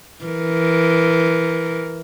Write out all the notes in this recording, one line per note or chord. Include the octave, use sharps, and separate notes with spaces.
E3 A#4